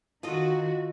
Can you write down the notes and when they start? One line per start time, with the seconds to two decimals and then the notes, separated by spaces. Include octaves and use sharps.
0.23 D#3 F4 F#4 A4 D#5